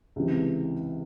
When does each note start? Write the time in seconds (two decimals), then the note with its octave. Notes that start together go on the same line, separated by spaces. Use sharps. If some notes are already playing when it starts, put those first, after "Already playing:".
0.16 C#2 C3 E3